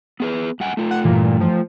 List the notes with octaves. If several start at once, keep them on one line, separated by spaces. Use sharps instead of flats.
B3 G#4 B4
G2 F#5 G#5
A3 F4
F#5
G2 A#2 E3
F3